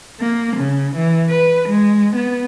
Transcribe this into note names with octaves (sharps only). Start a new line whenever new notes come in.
A#3
C#3
E3
B4
G#3
B3